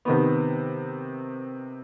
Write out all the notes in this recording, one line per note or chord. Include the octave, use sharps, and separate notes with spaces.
C3 D#3 B3